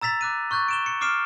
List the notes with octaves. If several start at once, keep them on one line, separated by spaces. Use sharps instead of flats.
A#5 E6 A6 B6 F7
D6 F#6 D#7
C#6 F#6 G6 A6
D7 E7 G7
C#7
D6 F6 C7 D7 E7